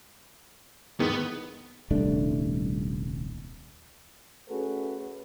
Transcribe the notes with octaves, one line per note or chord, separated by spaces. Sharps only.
E2 G#2 D#3 B3
D#1 C2 A3 D4
A3 C#4 F#4 G#4 A4 B4